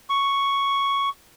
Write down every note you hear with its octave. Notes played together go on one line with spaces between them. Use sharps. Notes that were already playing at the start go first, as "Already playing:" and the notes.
C#6